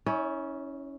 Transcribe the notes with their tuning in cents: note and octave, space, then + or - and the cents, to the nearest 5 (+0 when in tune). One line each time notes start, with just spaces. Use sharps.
C#4 +0 E4 -40 C#5 +45